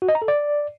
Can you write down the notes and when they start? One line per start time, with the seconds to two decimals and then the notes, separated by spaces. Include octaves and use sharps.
0.02 F#4
0.09 D#5
0.15 A#5
0.22 A4
0.28 D5